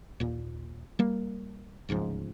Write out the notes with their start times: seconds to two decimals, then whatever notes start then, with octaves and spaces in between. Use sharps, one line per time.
0.20 D#2 A#2
0.99 G3 A#3
1.89 D1 C#2 G#2 F3